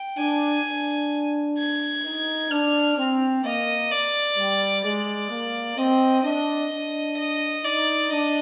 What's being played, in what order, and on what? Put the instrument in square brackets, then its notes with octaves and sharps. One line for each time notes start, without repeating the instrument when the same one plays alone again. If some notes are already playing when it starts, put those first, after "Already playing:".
Already playing: [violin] G5
[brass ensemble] D4 [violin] G#5
[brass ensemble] D4
[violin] G#6
[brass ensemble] D#4
[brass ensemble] D4 [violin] F6
[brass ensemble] C4
[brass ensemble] A#3 [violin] D#5
[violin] D5
[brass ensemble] G3
[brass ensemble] G#3 [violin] D5
[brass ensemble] A#3
[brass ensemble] C4 [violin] D#5
[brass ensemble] D4 [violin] D#5
[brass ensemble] D4
[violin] D#5
[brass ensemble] D#4 [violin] D5
[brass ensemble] D4 [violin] D#5